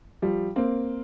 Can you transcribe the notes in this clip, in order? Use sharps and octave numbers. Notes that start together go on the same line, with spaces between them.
F3 G3
A#3 C4